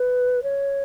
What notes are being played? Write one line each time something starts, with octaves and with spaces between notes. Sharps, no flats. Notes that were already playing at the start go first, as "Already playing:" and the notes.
Already playing: B4
C#5